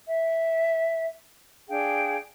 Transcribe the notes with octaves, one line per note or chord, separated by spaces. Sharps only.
E5
D4 G#4 F5 G5